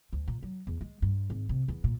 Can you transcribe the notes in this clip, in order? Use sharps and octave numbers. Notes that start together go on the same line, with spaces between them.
D2
A#2
F#3
E2
G#3
G2
G#1
C3
E2
A#2